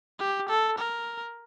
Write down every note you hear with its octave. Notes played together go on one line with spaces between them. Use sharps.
G4
A4
A#4